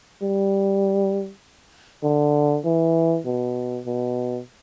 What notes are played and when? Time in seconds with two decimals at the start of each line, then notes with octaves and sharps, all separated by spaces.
0.22 G3
2.04 D3
2.65 E3
3.26 B2
3.86 B2